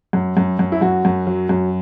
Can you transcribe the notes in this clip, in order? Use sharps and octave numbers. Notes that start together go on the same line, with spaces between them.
F#2
F#2
F#2
E4
F#2 F#4
F#2
F#3
F#2